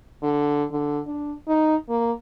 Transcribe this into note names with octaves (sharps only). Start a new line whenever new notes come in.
D3
D3
D4
D#4
A#3